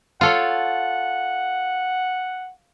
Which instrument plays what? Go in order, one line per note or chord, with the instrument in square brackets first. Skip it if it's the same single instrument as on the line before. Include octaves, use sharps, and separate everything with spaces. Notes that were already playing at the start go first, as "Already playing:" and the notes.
[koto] F4 A4 C#5 [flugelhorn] F#5